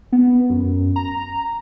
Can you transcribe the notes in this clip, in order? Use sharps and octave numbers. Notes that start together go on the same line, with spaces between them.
B3
F#2
A#5